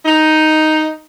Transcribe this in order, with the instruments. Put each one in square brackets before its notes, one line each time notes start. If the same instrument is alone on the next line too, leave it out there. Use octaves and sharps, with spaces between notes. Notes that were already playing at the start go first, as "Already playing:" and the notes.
[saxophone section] D#4